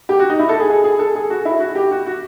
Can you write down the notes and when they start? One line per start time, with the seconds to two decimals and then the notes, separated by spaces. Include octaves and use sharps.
0.09 G4
0.19 F#4
0.30 D#4
0.39 E4
0.49 A4
0.60 G#4
0.70 G#4
0.84 G#4
0.99 A4
1.15 G#4
1.30 F#4
1.45 E4
1.60 F#4
1.75 G4
1.91 F#4
2.06 F#4